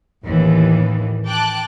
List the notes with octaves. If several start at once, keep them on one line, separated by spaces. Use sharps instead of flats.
A1 D#2 E3
G5 A5 D6 F#6